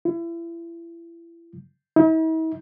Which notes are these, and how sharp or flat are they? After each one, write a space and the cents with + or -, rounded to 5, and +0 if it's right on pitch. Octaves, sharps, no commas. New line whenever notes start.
E4 +35
E4 -45